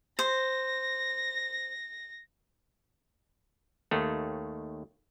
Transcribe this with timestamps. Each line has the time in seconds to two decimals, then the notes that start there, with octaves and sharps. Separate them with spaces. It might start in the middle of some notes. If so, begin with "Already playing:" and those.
0.19 C5 A#6
3.91 D#2 D#3 A3